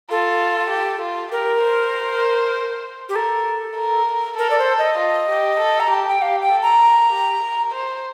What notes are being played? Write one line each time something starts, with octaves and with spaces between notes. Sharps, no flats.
F4 A4
G4
F4
G4 A#4
C5
G4
A4 A#4
A#4
A4 A#4
D5
C5
D#5
F4
G4
A4
A#5
G4 A5
G5
G4 F5
G5
A4
A#5
A#4
G4
A#4
C5